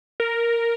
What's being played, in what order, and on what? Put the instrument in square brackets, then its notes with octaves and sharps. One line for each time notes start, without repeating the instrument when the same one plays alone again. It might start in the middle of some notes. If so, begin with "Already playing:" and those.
[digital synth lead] A#4